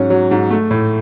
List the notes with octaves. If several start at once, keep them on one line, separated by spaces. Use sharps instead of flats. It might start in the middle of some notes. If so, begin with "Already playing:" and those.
Already playing: G#2 F#3 C#4
F#3
G#2
A3
A2